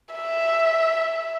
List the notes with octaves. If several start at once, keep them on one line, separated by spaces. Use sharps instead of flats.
E5